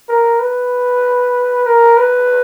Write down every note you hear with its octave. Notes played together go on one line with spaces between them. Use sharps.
A#4
B4
A#4
B4